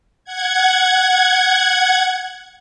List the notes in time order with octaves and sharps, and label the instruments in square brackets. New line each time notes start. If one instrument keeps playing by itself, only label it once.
[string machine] F#5 G#6